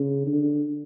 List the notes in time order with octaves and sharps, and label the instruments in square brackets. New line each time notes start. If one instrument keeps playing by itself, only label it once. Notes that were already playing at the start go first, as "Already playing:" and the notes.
Already playing: [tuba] C#3
D3